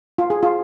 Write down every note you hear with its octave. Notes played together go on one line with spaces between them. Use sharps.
F4
G#4
F4